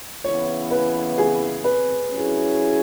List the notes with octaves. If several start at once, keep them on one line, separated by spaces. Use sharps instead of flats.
C#3 E3 B3 E4 C#5
B4
G#4
B4
F#3 C#4 E4 G#4